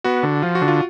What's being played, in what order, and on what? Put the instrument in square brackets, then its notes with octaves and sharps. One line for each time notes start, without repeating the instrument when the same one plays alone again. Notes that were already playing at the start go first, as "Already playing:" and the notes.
[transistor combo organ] B3 [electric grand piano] F#4
[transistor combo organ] D3
[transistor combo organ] F3 [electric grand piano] F4
[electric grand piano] F#4
[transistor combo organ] D3
[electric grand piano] F4